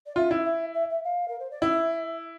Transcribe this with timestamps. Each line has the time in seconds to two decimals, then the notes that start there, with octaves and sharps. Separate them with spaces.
0.06 D5
0.16 F4 E5
0.31 E4
0.45 E5
0.74 E5
0.90 E5
1.04 F5
1.28 A#4
1.39 C5
1.51 D5
1.62 E4 E5